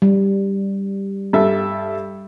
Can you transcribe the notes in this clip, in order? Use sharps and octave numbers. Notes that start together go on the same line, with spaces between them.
G3
G2 A4 E5